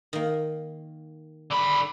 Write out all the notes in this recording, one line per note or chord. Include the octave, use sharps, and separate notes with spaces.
D#3 A#3
D3 B5